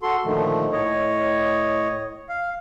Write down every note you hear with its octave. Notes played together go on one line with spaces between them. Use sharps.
F#4 A4 C6
A#2 D3 D#3 F3 A3
A2 C#5 D#5
F5